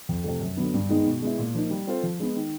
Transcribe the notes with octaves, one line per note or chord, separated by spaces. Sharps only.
F2
C3 F3 A3
F#2
D3 F#3 B3
G2
D#3 G#3 B3 D#4
B2
G#3 B3 E4
A#2
F3 A#3 D#4
G3
C4 F4 A4 C5
F3
G#3 B3
D#3